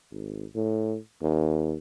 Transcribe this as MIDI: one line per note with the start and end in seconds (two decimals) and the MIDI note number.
0.11 0.45 32
0.55 0.97 45
1.21 1.77 39